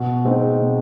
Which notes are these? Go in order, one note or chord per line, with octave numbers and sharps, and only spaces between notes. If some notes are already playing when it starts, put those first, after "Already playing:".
Already playing: B2
G#3 C4 D#4
B2